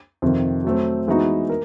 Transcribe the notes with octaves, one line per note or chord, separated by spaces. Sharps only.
F2 C3 D#3
F#3 A3 C4
E3 G#3 B3 D#4 F#4
A#4